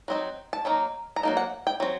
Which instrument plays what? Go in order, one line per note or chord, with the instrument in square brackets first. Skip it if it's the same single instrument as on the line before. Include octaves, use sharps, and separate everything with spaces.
[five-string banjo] F#3 C4 D#4
A5
F#3 A#3 D#4 A#5
A#5
F#3 A#3 D#4 A5
F#5
G5
F#3 C4